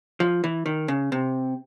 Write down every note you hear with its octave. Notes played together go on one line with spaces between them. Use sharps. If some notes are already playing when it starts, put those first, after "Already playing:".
F3
E3
D#3
C#3
C3